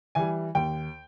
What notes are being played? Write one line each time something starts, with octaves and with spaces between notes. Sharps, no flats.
E3 G3 G#5
D#2 G5